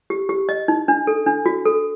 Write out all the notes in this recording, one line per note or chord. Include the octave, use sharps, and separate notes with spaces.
G4
G4
D#5
D#4
D4
A4
D4
F#4
A4